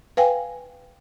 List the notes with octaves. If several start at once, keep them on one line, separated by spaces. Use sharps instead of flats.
B4 F5 G5 G#5